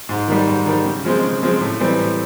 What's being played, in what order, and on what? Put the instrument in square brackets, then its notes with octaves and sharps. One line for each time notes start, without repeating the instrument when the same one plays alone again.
[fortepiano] G#2
D#3 G3
G#2
D#3 G3
C#3
F3 G#3 C4
C#3
F3 G#3 C4
A2
E3 G3 C4
A2